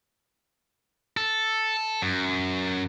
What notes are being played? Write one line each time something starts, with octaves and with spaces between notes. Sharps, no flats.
A4
F#2